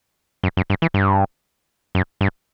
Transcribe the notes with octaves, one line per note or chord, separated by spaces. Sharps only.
F#2
F#2
G2
E3
G2
F#2
G2